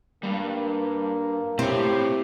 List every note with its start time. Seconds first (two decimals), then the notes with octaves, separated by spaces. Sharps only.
0.23 G2 C3 G3 A#3
1.59 C4 E4 G4 C#5